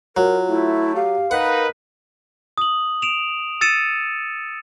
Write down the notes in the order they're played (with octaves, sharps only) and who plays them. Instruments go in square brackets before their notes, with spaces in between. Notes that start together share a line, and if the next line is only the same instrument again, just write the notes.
[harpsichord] F#3 [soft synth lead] F4 [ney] A#4
[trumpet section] A3 [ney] E4
[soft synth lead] G4 [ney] F5
[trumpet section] D#4 B4 [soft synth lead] A#4 [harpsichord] F#5
[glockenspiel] D#6 F#7
D7 E7 F7
E6 A6 C#7 D#7 E7